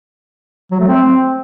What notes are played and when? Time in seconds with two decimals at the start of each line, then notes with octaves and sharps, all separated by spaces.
0.71 F#3
0.80 A3
0.88 C4